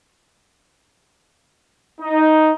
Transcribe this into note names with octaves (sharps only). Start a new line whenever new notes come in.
D#4